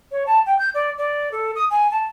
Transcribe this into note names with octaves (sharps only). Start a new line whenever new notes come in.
C#5
A5
G5
G6
D5
D5
A4
D#6
G#5
A5